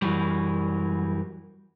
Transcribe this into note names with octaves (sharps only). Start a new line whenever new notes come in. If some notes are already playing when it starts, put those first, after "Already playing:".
F#2 E3 F#3 G3